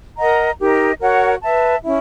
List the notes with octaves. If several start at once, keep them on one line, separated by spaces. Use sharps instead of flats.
A#4 D#5 F#5 A#5
D#4 G4 A#4 D#5
F#4 A#4 C#5 F#5
B4 E5 A5
C#4 E4